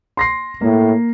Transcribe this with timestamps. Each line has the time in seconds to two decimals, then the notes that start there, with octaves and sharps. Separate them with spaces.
0.17 C6 A#6 C7
0.61 A2 A#3